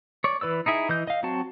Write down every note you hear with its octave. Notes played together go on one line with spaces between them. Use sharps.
C#5 D5
E3 B4 D5 E6
D#4 E4 G#4 E5
E3 D#5 G6
D#5 F5
F#3 C4 F#4 A5